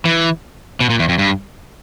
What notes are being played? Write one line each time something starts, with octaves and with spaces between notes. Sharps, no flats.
E3
B2
A#2
E2
F2
G2